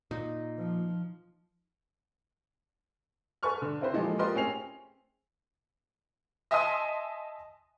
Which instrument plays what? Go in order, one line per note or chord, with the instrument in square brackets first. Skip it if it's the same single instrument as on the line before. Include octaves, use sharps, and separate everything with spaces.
[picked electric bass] A#2 [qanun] D#4
[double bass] F3
[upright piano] A4 B4 G#5 C#6 F6
D3
C4 E4 B4 C5
A#2 E3 F3 G#3 G4 A4
F4 G4 A#4 B4 D#5 C6
A2 C4 C#4 G#4 C7 F7
[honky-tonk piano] D#5 E5 G#5 A5 C6 D#6